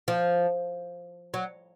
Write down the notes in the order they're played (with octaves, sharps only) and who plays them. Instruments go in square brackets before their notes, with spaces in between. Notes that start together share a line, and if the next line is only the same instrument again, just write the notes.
[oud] F3
F#3